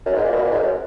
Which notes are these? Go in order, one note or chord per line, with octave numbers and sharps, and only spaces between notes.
F#2
G#2
A#2
B2
A#2
G#2
F#2